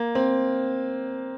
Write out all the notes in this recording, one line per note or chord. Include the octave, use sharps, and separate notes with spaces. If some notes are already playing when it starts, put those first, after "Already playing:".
Already playing: A#3
C4